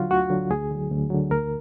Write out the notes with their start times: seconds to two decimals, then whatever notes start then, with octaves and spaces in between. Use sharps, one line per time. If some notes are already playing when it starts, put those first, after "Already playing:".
Already playing: D2 D3 F#3 F4 F#4
0.11 D2 F#4
0.30 D3 F#3
0.51 D2 G#4
0.71 D3 F#3
0.91 D2
1.10 D3 F#3
1.31 D2 A#4